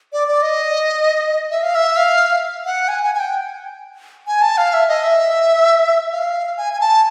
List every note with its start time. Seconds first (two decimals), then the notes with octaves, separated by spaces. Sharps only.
0.13 D5
0.28 D5
0.42 D#5
1.51 E5
1.63 F5
1.75 E5
1.97 F5
2.66 F#5
2.88 G#5
3.04 G#5
3.15 G#5
3.20 G5
4.27 G#5
4.42 A5
4.57 F5
4.73 E5
4.88 D#5
5.04 E5
6.12 F5
6.57 G#5
6.73 G#5
6.81 A5